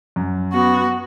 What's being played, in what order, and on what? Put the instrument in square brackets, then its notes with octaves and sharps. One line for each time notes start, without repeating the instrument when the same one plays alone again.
[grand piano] F#2
[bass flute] B3 [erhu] F#4